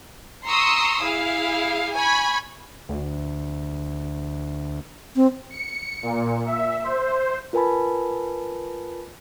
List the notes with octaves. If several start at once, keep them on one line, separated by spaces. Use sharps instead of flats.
A#5 C6 C#6 D#6 E6
E4 G#4 F5
G#5 B5 C#6 G#6
D2
C4
C#7
A#2
E5
C5
F4 A#4 B4 G#5 A5 B5